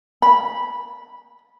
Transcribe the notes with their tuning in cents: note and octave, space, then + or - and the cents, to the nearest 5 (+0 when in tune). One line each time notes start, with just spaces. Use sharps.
B5 -10